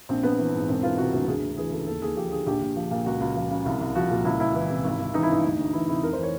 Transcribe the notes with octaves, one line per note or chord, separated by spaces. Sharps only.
A#1 C4
A#1 B3
E3
G#2
E1 C4
E3 F4
C3 F#4
D2 F#4
D2 G#4
D2
E3 G#4
C#3 A4
D#2 A4
D#2 G#4
F3 G4
D3 G#4
A#1 G4
A#1
F3
A#2
C#2 F#4
C#2 F4
F3
C#3
C2
C2
F3 F#4
A#2 F4
C#2 E4
C#2 E4
E3
C3
G#1
G#1
E3 D#4
E4
G2 D#4
D2
D2
E3 E4
C3 E4
F1 A#4
C5
E3 C#5